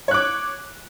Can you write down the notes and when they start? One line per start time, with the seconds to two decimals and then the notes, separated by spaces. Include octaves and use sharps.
0.08 C#5
0.11 F#6
0.14 D6